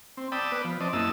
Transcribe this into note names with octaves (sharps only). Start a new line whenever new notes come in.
C4
D5 G5 A5 B5 D#6 E6
B3 B4 D5
F3
C4 D5 D#5 A5
F#2 A#3 E4 D#5 A5 E6